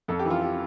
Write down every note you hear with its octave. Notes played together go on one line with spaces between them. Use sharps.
F2 A4
G4
E3
F4
G4